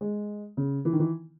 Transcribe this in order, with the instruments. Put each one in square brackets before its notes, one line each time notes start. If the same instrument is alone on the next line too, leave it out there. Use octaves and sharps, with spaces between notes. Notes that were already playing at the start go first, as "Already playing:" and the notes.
[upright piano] G#3
C#3
E3
D#3
E3